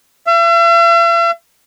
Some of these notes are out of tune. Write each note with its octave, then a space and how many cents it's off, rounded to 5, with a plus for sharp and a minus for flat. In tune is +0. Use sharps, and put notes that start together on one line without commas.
E5 +45